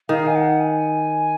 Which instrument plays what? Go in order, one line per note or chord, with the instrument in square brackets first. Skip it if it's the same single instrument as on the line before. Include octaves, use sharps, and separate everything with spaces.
[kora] D#3 [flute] F5
[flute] G#5
F#5
G#5